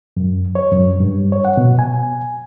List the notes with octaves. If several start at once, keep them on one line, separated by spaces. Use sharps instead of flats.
F#2
C#5
F#2
G2
C#5
F#5
B2
G#5